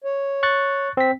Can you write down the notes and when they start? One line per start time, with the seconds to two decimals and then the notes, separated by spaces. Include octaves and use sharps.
0.04 C#5
0.43 C#6 F#6 A6
0.97 C4 B6